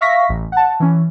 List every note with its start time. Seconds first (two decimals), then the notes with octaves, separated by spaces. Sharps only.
0.01 E5 F5 C#6 A#6 B6
0.29 A1
0.52 F#5 A5
0.80 E3 C#4